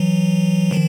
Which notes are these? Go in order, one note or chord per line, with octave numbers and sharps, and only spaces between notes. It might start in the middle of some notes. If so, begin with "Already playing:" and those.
Already playing: E3 F#3
D#3 F3